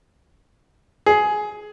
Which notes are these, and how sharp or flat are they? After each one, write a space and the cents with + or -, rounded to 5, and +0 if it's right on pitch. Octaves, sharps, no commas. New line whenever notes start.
G#4 +15